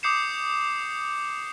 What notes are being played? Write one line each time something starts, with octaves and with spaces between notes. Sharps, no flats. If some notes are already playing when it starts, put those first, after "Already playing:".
D6 D#6 G6 C7 C#7 E7